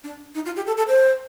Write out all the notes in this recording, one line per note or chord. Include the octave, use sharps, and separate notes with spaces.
D4
D#4
F4
G4
A4
A4
C5